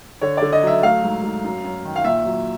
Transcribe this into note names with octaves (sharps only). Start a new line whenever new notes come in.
D3 C#5
D3 D5
D#5
F#3 E5
A3 F5
G#2
G#2
F#2
F#2
D#3
F5
A#2 E5
F#3